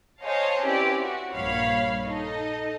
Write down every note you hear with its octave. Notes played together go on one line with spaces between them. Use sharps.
G#4 C5 C#5 D#5 F5 A5
C4 C#4 E4 G4 B4 D5
F#4
A#1 G2 A#3 C#5 F5 B5
D#4 A4 D#5